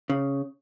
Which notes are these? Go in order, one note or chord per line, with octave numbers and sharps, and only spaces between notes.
C#3